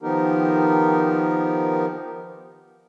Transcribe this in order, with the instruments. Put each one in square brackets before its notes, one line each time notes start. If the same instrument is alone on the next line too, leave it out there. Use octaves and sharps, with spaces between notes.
[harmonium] D#3 F3 B3 D#4 G4 A#4